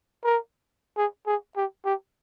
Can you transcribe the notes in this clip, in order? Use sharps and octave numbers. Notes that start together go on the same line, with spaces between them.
A#4
G#4
G#4
G4
G4